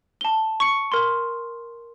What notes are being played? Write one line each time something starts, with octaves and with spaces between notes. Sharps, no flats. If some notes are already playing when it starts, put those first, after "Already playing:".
A5 G7
C#6 C#7
A#4 C6